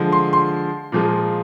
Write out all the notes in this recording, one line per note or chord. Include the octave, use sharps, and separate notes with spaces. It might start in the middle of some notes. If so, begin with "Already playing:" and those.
Already playing: D3 F3 G#3
C6
C6
A#2 F3 G#3